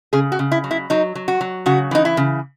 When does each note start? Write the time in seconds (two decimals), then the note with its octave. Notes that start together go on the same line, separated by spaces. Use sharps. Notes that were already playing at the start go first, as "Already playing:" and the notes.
0.13 C#3 G#4
0.32 F#4
0.39 C#3
0.52 E4
0.64 F#3
0.71 E4
0.90 F#3 D#4
1.15 F#3
1.28 F#4
1.41 F#3
1.66 C#3 F#4
1.91 E3 D#4
2.05 E4
2.17 C#3